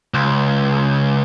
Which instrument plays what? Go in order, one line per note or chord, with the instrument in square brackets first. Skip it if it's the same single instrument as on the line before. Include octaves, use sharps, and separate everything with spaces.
[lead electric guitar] C#2